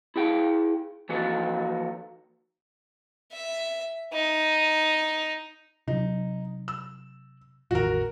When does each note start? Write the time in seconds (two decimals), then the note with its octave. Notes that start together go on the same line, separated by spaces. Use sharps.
0.16 E4 G#4 G5
1.09 E3 F3 A#3 D#4 F#4 A4
3.32 E5
4.14 D#4
5.88 C3 F#3 D#4
6.68 E6
7.71 A1 E2 D#3 F#4 A#4